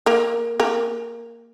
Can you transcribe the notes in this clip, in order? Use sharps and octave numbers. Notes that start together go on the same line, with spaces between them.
A#3 A#4
A#3 A#4